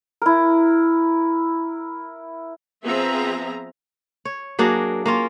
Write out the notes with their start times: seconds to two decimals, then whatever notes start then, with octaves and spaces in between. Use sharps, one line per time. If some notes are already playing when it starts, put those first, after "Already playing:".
0.22 E4 A#4
2.83 F3 B3 C4 G#4 E5 A#5
4.25 C#5
4.59 F#3 A#3 D4 G#4
5.06 A#3 C#4 F4